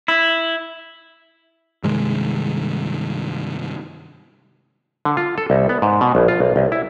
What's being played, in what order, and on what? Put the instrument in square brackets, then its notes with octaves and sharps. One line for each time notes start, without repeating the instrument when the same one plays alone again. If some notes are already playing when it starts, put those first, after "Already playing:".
[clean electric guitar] E4
[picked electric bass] G2 C3 D#3 G#3
[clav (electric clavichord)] D3
F4
A4
C2
B3
G#2
B2
A#1
F4
B1
C2
E4